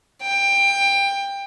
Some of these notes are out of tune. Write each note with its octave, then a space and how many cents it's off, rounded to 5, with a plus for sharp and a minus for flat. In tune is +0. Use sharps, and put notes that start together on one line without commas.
G5 +20